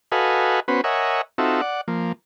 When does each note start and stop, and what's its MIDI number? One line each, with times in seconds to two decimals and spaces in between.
0.12 0.60 66
0.12 0.60 69
0.12 0.60 71
0.12 0.60 75
0.12 0.60 77
0.12 0.60 80
0.68 0.81 59
0.68 0.81 61
0.68 0.81 66
0.68 0.81 71
0.68 0.81 72
0.84 1.21 70
0.84 1.21 73
0.84 1.21 75
0.84 1.21 76
0.84 1.21 78
0.84 1.21 80
1.38 1.61 60
1.38 1.61 63
1.38 1.61 65
1.38 1.61 66
1.38 1.61 69
1.38 1.61 76
1.61 1.81 74
1.61 1.81 78
1.88 2.12 53
1.88 2.12 58